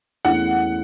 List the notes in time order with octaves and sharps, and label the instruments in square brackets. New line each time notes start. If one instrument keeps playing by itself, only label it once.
[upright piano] E2 E3 A3 C#4 E4 [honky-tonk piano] F#5